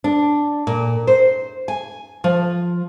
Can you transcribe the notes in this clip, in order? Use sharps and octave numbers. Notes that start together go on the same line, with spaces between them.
D4
A#2
C5
G#5
F3